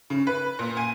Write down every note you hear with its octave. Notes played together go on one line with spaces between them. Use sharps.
C#3
B4
A#2
G#5